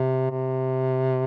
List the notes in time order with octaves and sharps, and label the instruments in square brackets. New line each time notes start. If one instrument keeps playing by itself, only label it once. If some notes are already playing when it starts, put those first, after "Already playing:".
Already playing: [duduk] C3
C3